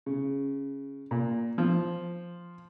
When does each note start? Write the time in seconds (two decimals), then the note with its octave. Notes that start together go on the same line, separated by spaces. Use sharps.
0.06 C#3
1.11 A#2
1.58 F3